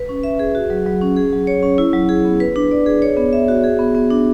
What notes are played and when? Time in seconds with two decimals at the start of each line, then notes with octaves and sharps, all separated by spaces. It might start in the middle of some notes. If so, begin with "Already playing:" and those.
Already playing: B4
0.09 C#4
0.23 E5
0.39 G#4
0.55 F#4
0.70 F#3
0.86 F#3
1.01 C#4
1.16 G#4
1.33 F#3
1.47 C#5
1.63 C#4
1.78 E4
1.93 F#3
2.09 G#4
2.25 B3
2.40 B4
2.56 D4
2.71 D5
2.86 G#4
3.02 C#5
3.17 B3
3.33 E5
3.48 F#4
3.64 G#4
3.79 B3
3.95 B3
4.10 D4